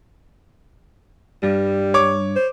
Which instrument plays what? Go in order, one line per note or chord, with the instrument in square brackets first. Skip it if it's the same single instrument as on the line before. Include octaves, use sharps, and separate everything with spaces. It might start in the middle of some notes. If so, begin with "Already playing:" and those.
[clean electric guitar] G2 [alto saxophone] G3
[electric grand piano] C#5 D6
[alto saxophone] C5